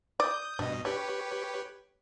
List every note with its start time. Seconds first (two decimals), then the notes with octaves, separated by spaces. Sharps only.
0.20 D5 D#6 G6
0.59 G2 B2 D4 D#5
0.85 D4 G4 B4 C#5